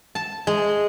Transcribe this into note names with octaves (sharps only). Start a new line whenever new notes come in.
A5
G#3